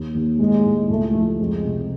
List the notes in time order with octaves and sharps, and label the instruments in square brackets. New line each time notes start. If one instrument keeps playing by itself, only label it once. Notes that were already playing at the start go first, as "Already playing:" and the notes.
Already playing: [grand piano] D#2
D#2
[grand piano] A2 [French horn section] G#3
[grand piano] A2
[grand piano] C#2 [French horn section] A3
[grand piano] F3
[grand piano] F2 [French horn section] G#3
[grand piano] C3